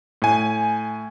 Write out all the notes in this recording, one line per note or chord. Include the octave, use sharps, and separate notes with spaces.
A2 G#5